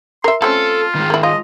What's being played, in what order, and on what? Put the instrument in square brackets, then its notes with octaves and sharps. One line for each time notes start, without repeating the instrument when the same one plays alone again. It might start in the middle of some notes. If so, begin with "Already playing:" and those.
[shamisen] A#4 E5 [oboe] C6
[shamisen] A3 C4 C#4 [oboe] F4 [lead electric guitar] A4
[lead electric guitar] D#3 G#3
[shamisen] A#3 E4
[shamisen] F4 [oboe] D#5